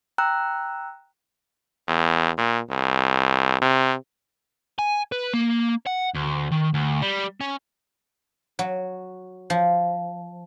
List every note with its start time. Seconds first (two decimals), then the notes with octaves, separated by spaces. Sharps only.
0.18 G5 A#5 E6 F#6
1.88 E2
2.38 A#2
2.70 C2
3.62 C3
4.79 G#5
5.12 B4
5.34 A#3
5.86 F#5
6.14 D2
6.51 D#3
6.74 D2
7.02 G3
7.41 C#4
8.59 F#3
9.50 F3